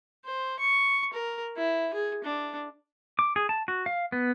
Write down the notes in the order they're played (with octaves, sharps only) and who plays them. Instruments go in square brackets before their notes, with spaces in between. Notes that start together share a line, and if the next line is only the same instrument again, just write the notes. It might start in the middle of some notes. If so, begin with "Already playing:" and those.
[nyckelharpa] C5
C#6
A#4
E4
G#4
D4
[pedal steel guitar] D6
G#4
A5
F#4
F5
B3